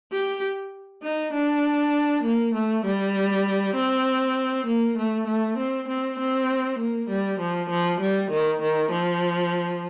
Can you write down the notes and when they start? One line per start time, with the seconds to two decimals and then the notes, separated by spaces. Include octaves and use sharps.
0.12 G4
1.03 D#4
1.33 D4
2.23 A#3
2.54 A3
2.85 G3
3.75 C4
4.66 A#3
4.98 A3
5.27 A3
5.58 C4
5.88 C4
6.19 C4
6.79 A#3
7.09 G3
7.40 F3
7.70 F3
8.00 G3
8.31 D#3
8.62 D#3
8.91 F3